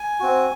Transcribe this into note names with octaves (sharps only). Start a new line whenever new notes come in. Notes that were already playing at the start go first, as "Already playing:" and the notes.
Already playing: G#5
C4 F#4